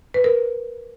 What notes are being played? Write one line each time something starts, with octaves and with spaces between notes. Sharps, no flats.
B4
A#4